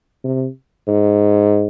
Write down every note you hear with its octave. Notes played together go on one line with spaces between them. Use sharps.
C3
G#2